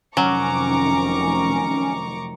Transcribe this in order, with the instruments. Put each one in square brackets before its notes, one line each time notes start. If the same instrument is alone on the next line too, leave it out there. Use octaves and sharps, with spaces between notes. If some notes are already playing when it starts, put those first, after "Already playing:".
[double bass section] F1 C3 D#3 [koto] F#3 [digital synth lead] C#4 [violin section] A#5 C#6 D6